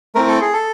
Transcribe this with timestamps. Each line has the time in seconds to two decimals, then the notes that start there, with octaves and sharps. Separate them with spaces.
0.15 A3 C4 E4 A#4
0.28 A4
0.41 G#4
0.53 A4